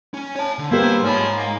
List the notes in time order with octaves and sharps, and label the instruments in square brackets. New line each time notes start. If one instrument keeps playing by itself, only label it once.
[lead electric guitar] C#4
C#5 A5
D3
[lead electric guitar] G2 B3 [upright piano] A#3 G4 B4 [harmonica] E4 C5
[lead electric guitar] G#2 [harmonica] F3 G#4 F6 [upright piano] C#5 B5
[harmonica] A#3